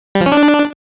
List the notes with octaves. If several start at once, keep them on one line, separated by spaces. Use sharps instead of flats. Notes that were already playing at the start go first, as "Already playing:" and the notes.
G3
F3
C#4
D4